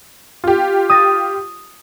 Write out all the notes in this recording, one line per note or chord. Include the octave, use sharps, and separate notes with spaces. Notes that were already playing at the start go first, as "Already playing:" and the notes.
F4 G4
D#6 A6 A#6